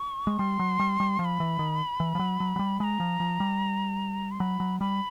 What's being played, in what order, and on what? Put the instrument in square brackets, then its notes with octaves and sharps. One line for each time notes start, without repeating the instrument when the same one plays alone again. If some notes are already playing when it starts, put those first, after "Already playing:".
Already playing: [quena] C#6
[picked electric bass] G#3
[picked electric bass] G3 [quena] C6
[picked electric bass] F#3
G3
G3
[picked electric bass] F3 [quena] C6
[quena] B5
[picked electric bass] E3
D#3
E3
F3
F#3
F#3
F#3
G3
[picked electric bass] G#3 [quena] A#5 B5
[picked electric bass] F3
F3
G3
[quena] C6
[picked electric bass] F#3 [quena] B5
[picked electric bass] F#3
[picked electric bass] G3 [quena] B5